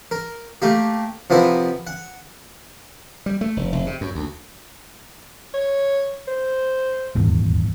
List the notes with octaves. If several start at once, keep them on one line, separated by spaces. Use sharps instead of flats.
A#4
A3 A#3 G4
C3 F3 B3 E4 A#4
F#5
G3
A3
F1
F1
C3
F#2
D2
C#5
C5
D#1 G#1 E2